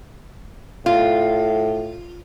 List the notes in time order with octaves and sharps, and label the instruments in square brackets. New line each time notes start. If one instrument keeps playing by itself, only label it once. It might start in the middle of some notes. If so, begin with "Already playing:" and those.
[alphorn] A2 [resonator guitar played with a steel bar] F4